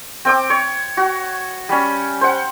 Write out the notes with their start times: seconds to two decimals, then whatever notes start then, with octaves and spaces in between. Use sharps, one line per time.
0.25 C4 G5 D6
0.50 C#5
0.97 F#4
1.69 G3 C#4
2.21 C5 F#5